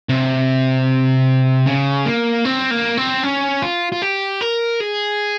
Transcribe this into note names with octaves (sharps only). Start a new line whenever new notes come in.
C3
C#3
A#3
C4
A#3
C4
C#4
F4
F4
G4
A#4
G#4